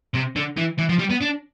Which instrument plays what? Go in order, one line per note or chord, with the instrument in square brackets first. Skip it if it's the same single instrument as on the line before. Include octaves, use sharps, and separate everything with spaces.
[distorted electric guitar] C3
D3
E3
E3
F3
G3
B3
D4